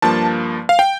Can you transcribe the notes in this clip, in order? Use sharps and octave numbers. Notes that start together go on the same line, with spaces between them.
G2 F3 A#3 A5
F5
G5